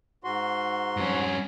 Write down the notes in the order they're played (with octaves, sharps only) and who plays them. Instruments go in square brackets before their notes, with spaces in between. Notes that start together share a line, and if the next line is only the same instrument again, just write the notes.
[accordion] G#2 F#4 C6
[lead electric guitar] G2 C#4